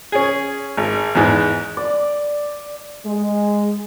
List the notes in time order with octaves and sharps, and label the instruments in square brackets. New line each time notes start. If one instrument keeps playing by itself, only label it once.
[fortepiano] C#4 G#4
G#1
E2 G#2
[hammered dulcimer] D5
[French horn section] G#3